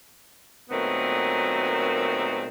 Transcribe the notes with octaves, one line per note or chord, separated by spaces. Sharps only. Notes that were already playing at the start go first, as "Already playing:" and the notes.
A#2 D#3 F#3 A3 B3 C4